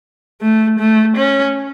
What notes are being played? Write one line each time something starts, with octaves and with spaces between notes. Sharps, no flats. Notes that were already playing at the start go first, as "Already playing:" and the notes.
A3
A3
C#4